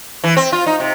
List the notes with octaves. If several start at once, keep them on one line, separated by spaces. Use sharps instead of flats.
E3
C4
F4
D#4
C3